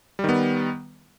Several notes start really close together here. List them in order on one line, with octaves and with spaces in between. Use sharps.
G3 D#3 B3